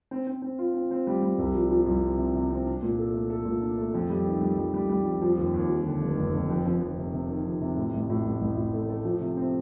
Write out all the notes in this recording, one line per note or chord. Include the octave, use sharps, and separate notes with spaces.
C4
C4
C4
F4
C4
C4
G3
G3
C2
F3
F3
C2
C4
C3
C3
C4
D4
A#2
A4
A3
A4
A#2
D4
A3
F2
G3
D#3
G3
F2
G3
G3
F2
F3
D#2
D#2
F3
D3
F1
F1
F1
F2
F2
F2
C3
C3
D#3
F2
C3
A2
A1
A2
A1
A1
A2
A3
A3
F3
C3
C4